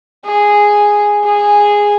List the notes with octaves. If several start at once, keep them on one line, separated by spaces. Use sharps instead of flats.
G#4
G#4